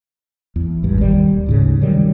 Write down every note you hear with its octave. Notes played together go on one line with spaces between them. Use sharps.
E2
G#1 G2
D#1 D#3 G3
D2 G#2 C#3
C3 D#3 F#3 G3